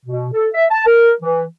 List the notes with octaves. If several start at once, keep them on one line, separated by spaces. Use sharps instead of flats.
B2
A4
E5
A5
A#4
E3